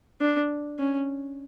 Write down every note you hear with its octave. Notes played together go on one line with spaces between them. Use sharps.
D4
C#4